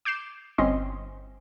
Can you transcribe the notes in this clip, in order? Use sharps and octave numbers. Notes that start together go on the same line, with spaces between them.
D6 G6 C7 E7
G1 C4 C#4 D#5 C6